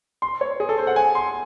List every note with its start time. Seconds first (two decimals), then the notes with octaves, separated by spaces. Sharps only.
0.22 C6
0.41 C#5
0.60 G#4
0.69 A4
0.78 C5
0.87 F#5
0.96 G#5
1.15 C6